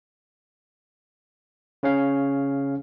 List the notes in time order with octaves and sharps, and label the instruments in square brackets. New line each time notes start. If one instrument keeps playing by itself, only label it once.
[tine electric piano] C#3 C#4 F5